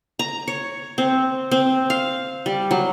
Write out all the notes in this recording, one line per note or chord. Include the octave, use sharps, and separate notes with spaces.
A#5
C#5
C4
C4
F5
G3
F#3